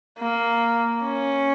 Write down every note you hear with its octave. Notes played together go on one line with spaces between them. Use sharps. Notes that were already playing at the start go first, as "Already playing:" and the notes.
A#3
C#4